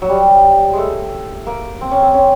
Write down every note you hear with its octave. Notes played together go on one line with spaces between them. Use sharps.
F#3
G3
G#3 A3
A#3
C4
C#4
C4
C#4